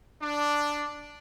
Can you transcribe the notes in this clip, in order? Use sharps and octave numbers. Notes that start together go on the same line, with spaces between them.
D4